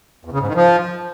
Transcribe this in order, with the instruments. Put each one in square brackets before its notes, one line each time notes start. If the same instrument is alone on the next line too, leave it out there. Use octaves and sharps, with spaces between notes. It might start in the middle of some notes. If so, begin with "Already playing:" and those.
[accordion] E2
C#3
G#2
D#3
F3